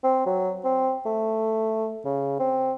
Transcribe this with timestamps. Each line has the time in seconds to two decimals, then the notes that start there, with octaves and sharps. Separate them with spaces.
0.04 C4
0.26 F#3
0.64 C4
1.06 A3
2.05 C#3
2.39 C4